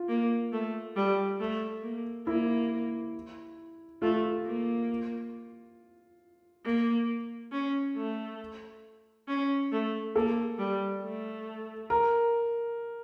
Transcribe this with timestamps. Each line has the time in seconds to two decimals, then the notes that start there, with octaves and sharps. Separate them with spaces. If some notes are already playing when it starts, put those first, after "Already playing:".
Already playing: F4
0.09 A#3
0.52 A3
0.96 G3
1.40 A3
1.83 A#3
2.27 A#3 E4
4.02 A3 F4
4.46 A#3
6.65 A#3
7.52 C#4
7.96 A3
9.28 C#4
9.72 A3
10.16 A#3 A4
10.59 G3
11.03 A3
11.90 A#4